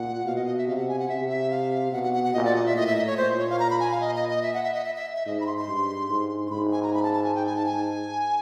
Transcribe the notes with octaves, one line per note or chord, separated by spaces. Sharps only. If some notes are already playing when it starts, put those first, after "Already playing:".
Already playing: A#2 F#5
B2 F5
D#5
D#5
E5
C3 F5
F#5
G#5
F#5
C3 E5
E5
F5
B2 F#5
F#5
F#5
F#5
A#2 D#5
D5
D#5
E5
A2 D#5
E5
D#5
C#5
A#2 C5
C#5
F5
A#5
B5
G#5
F5
D#5
D#5
D#5
E5
F#5
E5
D#5
E5
E5
E5
G#2 D#5
B5
C6
C6
G2
G#2
C6
G#2 B5
G#5
A#5
B5
A5
A5
G#5
G5
G#5
A5
G#5